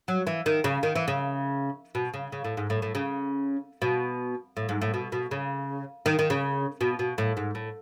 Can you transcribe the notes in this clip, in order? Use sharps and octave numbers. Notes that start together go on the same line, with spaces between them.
F#3
E3
D#3
C#3
D#3
E3
C#3
B2
C#3
C#3
A2
G#2
A2
A2
C#3
B2
A2
G#2
A2
B2
B2
C#3
D#3
D#3
C#3
B2
B2
A2
G#2
A2